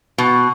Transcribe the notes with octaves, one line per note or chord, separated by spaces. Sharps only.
B2